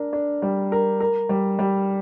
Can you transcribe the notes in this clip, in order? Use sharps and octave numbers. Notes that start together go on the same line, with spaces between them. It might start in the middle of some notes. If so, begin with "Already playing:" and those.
Already playing: D4 A#4
D4
G3
A#4
A#4
G3
G3